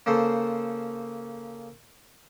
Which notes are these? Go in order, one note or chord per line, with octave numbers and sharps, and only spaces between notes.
C#3 A#3 A4 C5